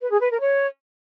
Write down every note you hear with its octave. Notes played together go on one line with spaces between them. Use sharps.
B4
G#4
B4
A#4
C#5